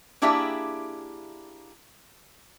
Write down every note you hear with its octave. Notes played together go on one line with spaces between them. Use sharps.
A#3 D4 E4 G4 G#4 E5